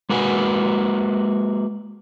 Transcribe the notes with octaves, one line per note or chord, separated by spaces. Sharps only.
G#3 A#3 F#4 B4 G#5